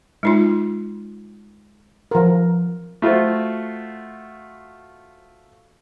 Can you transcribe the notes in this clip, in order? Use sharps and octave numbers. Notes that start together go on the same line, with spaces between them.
G#3 D#4 F4
F3 A#4
A3 F4 F#4 C5